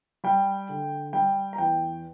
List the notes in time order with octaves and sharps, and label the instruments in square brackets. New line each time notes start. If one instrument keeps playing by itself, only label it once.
[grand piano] G3 G5
D3
G3 G5
A#5
E2 G5